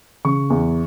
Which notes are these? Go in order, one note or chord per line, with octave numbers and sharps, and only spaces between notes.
C#3 C#6
E2